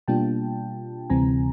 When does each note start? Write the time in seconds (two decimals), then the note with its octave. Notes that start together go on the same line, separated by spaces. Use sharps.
0.08 B2 G3 A#3 D4 F4 G5 A5
1.10 D2 C3 E3 G3 C4 G#5 A#5